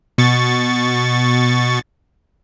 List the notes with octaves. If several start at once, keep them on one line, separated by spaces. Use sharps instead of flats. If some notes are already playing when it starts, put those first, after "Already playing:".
B2 C#6 A6